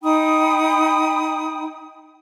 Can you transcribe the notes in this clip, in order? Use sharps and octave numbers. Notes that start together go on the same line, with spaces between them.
D#4 G5 B5 D#6